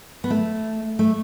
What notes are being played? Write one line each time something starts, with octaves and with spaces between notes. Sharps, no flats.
B3
A3
A3